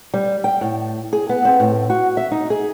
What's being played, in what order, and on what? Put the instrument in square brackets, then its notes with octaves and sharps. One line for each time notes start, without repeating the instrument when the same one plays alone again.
[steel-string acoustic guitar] G3
G5
A2
G#4
B3
C4
A2
F#4
E5
D#4
G#4